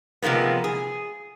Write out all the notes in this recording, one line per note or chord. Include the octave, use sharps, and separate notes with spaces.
C3 F3 G#3 A#3 B3
G#4